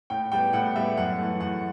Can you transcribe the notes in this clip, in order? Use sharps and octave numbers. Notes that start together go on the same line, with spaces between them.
A2 G5
G3 B3 G5
A2 F#5
G3 B3 E5
F#2 F#5
E3 A3
F#2 F#5